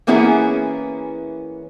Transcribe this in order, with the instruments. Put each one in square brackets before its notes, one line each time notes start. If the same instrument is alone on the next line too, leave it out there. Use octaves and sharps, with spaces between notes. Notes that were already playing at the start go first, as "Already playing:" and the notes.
[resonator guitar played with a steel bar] E3 A#3 B3 C#4 E4 G#4